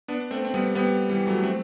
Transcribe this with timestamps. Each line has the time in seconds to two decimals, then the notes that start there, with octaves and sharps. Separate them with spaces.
0.08 B3 D4
0.31 A3 C4
0.45 C4
0.54 G3 B3
0.75 G3 B3
1.10 E3 G3
1.27 F#3 A3
1.43 A3 C4